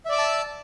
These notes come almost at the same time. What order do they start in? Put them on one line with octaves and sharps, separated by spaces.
E5 D5 D6 E6 A5